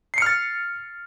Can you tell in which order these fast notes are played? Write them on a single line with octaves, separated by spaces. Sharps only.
C7 C#7 F6 A6